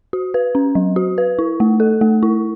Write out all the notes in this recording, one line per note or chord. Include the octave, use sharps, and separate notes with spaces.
F#4
B4
C#4
F#3
F#4
B4
E4
A3
A4
A3
E4